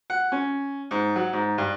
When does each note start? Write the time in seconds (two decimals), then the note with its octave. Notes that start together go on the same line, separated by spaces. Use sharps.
0.10 F#5
0.32 C#4
0.91 G#2
1.16 F#3
1.33 G#2
1.58 G2